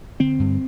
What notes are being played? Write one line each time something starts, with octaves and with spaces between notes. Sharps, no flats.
D3 C4
G2